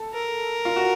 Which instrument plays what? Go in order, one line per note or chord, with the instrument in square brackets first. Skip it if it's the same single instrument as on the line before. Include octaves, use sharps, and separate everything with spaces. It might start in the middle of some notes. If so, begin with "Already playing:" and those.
Already playing: [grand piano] A4
[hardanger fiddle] A#4
[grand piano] F4
F#4